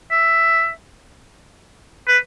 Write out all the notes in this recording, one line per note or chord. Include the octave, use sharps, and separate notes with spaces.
E5
B4